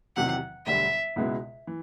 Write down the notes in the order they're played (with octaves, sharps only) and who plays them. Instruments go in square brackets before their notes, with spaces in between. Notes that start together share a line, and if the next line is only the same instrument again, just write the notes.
[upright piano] E2 C3 D#3 F#3 [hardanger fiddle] F#5
[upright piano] E1 D2 D3 G3 [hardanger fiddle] E5
[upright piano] C#2 B2 G#3 B3 E4
E3